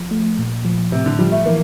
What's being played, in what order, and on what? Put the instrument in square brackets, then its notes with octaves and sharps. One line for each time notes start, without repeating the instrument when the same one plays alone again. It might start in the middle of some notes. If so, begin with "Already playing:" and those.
Already playing: [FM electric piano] F3
A3
A#2
F3
[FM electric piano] A2 [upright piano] C3
[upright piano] D3
[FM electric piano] F3 [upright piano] G3
[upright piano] A3
[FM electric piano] E3 [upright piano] A#3